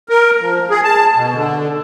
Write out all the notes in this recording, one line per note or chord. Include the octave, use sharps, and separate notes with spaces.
A#4
F3
G#4
A5
B2
D3